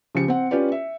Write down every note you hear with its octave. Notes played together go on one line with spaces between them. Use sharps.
C#3 F3 G4 C#7
C4 F#5
C#4 F4 G4 B4 D5
E5